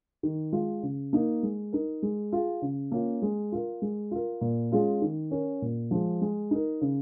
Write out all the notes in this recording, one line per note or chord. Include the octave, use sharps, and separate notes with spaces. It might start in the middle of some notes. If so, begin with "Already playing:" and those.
D#3
G#3 F4
C#3
A#3 D#4 A#4
G#3
D#4 A#4
G#3
F4 G#4
C#3
A#3 C#4 F4
G#3
F4 A#4
G#3
F4 A#4
A#2
G#3 C#4 F4 G#4
D#3
C#4 A#4
A#2
F3 G#3
G#3
D#4 A#4
C#3